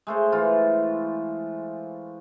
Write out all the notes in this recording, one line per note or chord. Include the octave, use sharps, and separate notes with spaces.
G#3 A3 C5
E3 F4